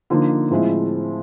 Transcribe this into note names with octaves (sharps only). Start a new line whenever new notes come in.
D3 F3 A#3 D#4
A2 F3 G#3 C4 E4